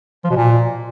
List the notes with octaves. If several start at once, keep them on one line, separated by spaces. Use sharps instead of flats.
F3
B2
A#2